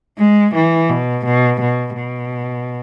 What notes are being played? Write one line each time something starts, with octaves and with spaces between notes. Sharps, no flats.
G#3
E3
B2
B2
B2
B2